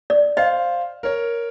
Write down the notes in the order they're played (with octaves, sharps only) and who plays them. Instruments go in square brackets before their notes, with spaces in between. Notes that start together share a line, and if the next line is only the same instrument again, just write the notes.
[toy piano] D5
[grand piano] C5 F5 [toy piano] D#5
[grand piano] A#4 C#5